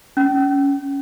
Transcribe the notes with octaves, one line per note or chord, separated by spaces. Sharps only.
C#4